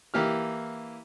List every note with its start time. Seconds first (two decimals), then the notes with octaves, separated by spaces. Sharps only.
0.14 E3 A#3 G4 F6